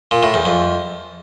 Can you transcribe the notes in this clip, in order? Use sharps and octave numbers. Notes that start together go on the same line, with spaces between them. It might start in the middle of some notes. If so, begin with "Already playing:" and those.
A#2
A2
E2
F2